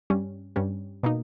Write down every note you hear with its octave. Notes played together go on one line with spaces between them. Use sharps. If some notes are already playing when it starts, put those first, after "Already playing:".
G2 G3 C#4
G2 G3 C#4
B2 A#3 D#4